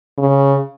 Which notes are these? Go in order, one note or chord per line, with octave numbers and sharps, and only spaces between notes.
C#3